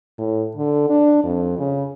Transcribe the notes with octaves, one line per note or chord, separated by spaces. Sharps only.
A2
D3
D4
F2
C#3